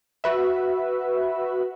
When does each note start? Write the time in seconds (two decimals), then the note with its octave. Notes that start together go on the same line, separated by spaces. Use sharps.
0.24 F#4 B4 E5